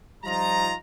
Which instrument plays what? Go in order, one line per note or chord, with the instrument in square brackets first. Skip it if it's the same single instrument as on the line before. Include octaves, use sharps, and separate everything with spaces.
[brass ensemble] F3 G3 D#4 F4 A#5